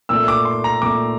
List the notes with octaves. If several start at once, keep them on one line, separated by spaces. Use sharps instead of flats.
A#2 A3 E6
D6
C6
A#5
A#2 A3 D6